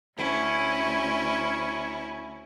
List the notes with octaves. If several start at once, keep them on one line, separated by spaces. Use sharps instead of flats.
D2 C#4 E4